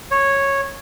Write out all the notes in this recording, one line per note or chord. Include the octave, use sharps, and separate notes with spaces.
C#5